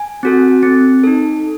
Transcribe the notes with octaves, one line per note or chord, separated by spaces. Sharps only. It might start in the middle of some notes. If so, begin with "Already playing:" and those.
Already playing: G#5
C4 F#4 A4
C4
D#4 A4